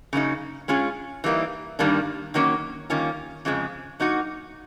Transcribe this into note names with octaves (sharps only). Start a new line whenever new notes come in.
C#3 F#3 A#3 D#4
G#3 C#4 F4 G#4
E3 G3 A#3 D#4
G2 D#3 G3 A#3 D4
D#3 F#3 A#3 C#4
D#3 G3 A#3 C#4 F4
F2 C#3 F3 G#3
F#3 A#3 D#4 F#4